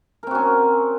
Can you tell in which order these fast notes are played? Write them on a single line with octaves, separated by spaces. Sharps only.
A#4 C4 F#4 C#4